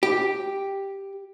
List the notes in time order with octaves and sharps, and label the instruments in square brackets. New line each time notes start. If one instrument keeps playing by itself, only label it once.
[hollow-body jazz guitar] G4